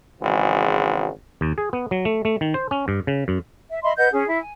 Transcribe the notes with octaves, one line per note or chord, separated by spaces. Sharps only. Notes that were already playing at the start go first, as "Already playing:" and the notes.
G#1 C#3 E3 G#3 F#4
D#2
G#4
B3
F#3
A3
A3
D#3
C5
C#4
G2
C#3
F#2
E5
D#5 E5 B5 C6
B4 D#5 F#5 G6
C#4 G#4
E4
G#5